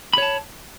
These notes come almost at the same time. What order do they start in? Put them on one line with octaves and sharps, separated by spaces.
B5 C#5 A5